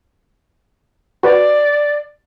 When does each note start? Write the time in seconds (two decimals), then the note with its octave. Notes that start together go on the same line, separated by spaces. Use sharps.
1.23 F#4 B4 D5